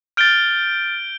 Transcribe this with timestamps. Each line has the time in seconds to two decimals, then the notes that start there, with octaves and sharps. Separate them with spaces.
0.17 F6 G6 A6 D7 G7